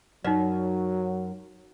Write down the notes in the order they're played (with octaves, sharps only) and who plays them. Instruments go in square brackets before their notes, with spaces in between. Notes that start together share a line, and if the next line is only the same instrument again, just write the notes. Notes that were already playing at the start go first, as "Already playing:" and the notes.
[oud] F#2 [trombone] F#3 [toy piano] D#4 D5